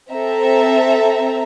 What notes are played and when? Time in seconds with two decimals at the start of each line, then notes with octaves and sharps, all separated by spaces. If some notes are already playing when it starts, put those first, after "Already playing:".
0.12 C4 A4 E5 A#5